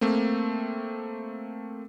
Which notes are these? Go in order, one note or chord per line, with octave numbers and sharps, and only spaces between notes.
A3 A#3 C4